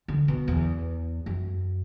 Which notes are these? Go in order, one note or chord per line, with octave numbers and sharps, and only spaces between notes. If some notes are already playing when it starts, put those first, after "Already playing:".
D3
B2
E2
F#2